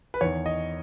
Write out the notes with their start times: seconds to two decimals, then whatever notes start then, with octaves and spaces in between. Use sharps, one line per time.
0.14 B4
0.21 E2 D#3 C#5
0.46 D#5